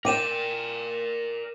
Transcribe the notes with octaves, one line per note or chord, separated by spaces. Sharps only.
A#4 D5 G5 D6 D#7 E7